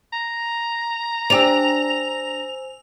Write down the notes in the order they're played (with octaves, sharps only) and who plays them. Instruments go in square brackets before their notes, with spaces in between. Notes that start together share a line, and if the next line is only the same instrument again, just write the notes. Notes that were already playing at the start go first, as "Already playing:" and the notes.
[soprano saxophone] A#5
[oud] D4 G4 [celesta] C5 G#5 E6 [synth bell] F7